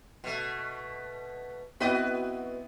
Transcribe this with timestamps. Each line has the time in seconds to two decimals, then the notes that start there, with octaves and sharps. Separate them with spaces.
0.24 B2 A3
1.80 B3 C4 E4 F#4 B4 D#5